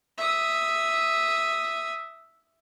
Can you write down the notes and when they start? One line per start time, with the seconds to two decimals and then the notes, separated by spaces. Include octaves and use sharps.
0.18 E5 D#6